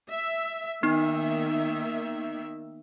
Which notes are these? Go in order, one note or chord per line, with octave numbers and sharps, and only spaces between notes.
E5
D#3 A#3 B3 D#4 E5